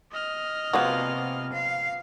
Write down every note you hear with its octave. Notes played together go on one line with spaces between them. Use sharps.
D#5 F6
C3 F3 G#3 A#3 B3 F4 F#4
F5